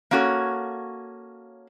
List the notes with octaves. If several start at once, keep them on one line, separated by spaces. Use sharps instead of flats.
A#3 C#4 D4 F#4 A4 C#5